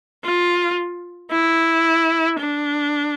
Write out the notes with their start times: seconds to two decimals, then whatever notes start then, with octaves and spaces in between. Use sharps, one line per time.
0.24 F4
1.31 E4
2.39 D4